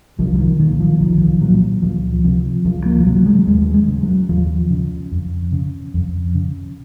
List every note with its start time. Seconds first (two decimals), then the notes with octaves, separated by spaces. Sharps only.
0.19 C2 F3
0.34 F3
0.39 D#3
0.59 A#2 D#3
0.80 F3
1.00 C2 D#3
1.21 F3
1.41 A#2 F#3
1.82 C#2 F3
2.24 C3 F3
2.65 C#2 F3
2.86 A#3
3.00 F3
3.06 C3 F#3
3.26 G#3
3.47 D#2 G#3
3.74 G#3
3.88 C#3
4.03 F#3
4.29 D#2 F3
4.71 C#3
5.12 F2
5.52 C#3
5.94 F2
6.35 C#3